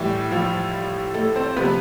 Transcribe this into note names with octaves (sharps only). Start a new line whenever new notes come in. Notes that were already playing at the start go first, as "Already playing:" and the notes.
Already playing: A2 E3 G3 E4
F3 F4
A3 A4
C4 C5
C3 F3 B3 B4